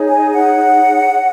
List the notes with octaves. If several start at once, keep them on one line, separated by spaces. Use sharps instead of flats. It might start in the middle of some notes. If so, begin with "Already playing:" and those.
Already playing: D#4 G#4 C#5
G#5
F#5